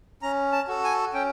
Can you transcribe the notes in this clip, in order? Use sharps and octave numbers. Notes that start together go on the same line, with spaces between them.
C#4 A#5
A5
F#4 A4
G#5
C#4 G5